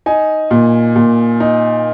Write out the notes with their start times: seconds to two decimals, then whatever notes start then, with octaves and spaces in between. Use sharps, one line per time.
0.06 D#4 G#5
0.51 A#2
0.96 A#2
1.40 D#4